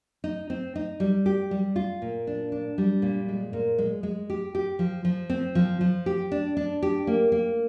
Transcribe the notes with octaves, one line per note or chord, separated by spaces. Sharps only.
D#4
C4
D#4
G3
G4
G3
F4
A#2
D4
D4
G3
A#2
G#3
A#2
G#3
G#3
G4
G4
F3
F3
C4
F3
F3
G4
D4
D4
G4
A#3
A#3